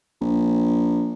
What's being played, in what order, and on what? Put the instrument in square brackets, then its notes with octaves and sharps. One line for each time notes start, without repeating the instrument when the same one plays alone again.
[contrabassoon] A#1